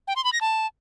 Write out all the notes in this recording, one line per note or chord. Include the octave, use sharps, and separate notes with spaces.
G5
C6
B5
A#6
A5